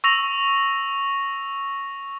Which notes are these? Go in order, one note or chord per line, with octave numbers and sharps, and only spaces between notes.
C#6 E6 A#6 F7